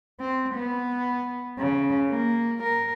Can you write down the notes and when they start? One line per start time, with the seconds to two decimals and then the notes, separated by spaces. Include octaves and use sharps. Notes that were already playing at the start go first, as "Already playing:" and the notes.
0.20 C4
0.54 B3
1.59 C#3
2.09 A#3
2.63 A#4